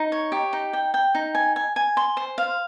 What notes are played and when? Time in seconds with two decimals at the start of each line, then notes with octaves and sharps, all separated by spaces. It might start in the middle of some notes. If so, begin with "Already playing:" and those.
Already playing: D#4
0.12 C#5
0.32 G4
0.53 D#4
0.73 G5
0.94 G5
1.15 D#4
1.35 G#5
1.56 G#5
1.76 G#5
1.97 C6
2.17 C5
2.38 F5